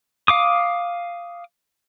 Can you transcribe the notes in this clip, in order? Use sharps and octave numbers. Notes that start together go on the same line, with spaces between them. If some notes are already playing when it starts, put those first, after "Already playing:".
F5 D6 D#6